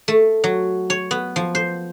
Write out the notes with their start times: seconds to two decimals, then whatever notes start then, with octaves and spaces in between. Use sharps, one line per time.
0.08 A3
0.44 F#3
0.90 C#5
1.11 B3
1.36 F3
1.55 C5